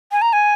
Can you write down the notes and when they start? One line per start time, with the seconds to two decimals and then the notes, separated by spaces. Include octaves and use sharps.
0.12 G#5
0.22 A#5
0.33 G#5